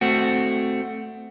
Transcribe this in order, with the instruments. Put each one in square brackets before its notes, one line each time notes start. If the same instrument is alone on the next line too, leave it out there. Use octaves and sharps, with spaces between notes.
[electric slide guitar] A3 C4 F#4